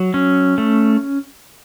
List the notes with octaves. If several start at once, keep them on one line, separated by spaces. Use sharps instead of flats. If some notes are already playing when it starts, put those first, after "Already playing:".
Already playing: F#3
C#4
A3